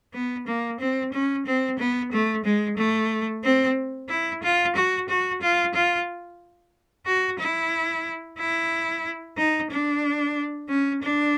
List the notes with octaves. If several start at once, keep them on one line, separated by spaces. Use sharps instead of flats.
B3
A#3
C4
C#4
C4
B3
A3
G#3
A3
C4
E4
F4
F#4
F#4
F4
F4
F#4
E4
E4
D#4
D4
C#4
D4